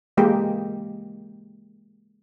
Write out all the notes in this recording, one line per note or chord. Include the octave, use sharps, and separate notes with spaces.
E3 G#3 A#3 G4